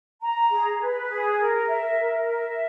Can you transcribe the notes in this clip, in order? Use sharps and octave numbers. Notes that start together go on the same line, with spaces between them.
A#5
G#4
B4
G#4
A#4
E5
A#4
E5